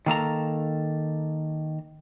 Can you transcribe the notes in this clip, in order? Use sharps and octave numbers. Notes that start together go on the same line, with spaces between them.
D#3 A#3 A4 A#5